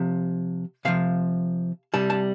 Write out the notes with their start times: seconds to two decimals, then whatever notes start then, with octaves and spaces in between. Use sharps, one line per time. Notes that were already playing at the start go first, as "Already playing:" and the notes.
Already playing: C3 F3
0.85 C3 F3 F5
1.94 C3 G3 A5
2.10 A5